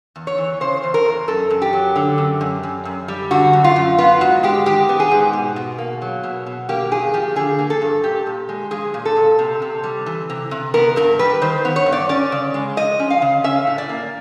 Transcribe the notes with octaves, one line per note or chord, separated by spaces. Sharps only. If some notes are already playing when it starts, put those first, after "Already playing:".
E2
C#5
E3
C#3 C5
E2
A#4
E2
F#2 A4
F#2
G4
F#3
D3
F#2
F#2
F#2
F#2
G3
D3 F#4
F#2
F4
F#2
B3 F4
G#2 F#4
G#3 G4
D#3 G4
B3
G#4
G#2
B2
B2
A#3
F#3
B2
B2
A#3 G4
G2 G#4
F3 G4
D3 G#4
A#3
A4
G2
A#2 G4
A#2
G#3
F3 G#4
A#2
A4
A#2
C3
C3
G3
E3
C3
C3
B3 A#4
G2 A#4
G3 B4
D#3 C5
B3
C#5
G2
D5
C#4 D5
C#3
G#3
F3 D#5
C#4
F5
C#3
C#4 E5
A2
D5
A#3